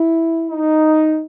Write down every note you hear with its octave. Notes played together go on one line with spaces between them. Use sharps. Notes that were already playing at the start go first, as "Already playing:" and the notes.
Already playing: E4
D#4